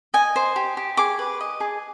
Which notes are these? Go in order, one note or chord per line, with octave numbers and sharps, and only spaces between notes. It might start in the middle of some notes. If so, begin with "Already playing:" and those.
D#5 G#5
C5
G4
G4
G#4 D6
B4
D#5
G#4